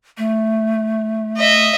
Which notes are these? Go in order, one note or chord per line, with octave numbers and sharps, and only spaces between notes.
A3
D#5 E5